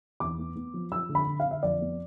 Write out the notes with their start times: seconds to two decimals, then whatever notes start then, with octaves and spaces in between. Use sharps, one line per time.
0.20 E2 D6
0.38 B3
0.56 B3
0.74 F3
0.92 F3 E6
1.09 D3
1.15 B5
1.27 D3
1.40 F5
1.46 D3
1.51 E5
1.63 F2 D5
1.81 B3